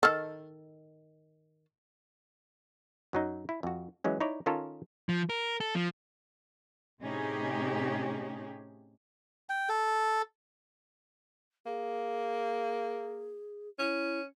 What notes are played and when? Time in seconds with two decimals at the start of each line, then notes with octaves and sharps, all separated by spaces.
0.03 D#3 A4 E6 F6
3.13 F#2 F#3 D#4
3.49 E4
3.63 F2 F#4
4.04 E3 F#3 G#3 C#4
4.20 D#4 E4 C#5 D5
4.46 D#3 C#4 F4 A4 A#4 C#5
5.09 F3
5.30 A#4
5.60 A4
5.75 F3
7.02 A2 C3 C#4 D#4 G4 G#4
9.49 G5
9.69 A4
11.66 A#3 G#4
13.79 C#4 E4